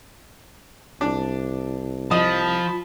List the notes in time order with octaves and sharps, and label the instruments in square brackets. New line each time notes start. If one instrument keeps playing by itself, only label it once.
[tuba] C2 [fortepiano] D4
[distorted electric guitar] F3 [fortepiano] D#5 [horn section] A5 B5